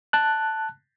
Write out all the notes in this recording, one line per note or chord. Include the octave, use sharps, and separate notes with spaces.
A5 F#6